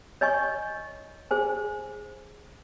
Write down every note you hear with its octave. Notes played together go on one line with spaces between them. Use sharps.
C#5 D#5 G#5 C#6
G#4 C5 G#5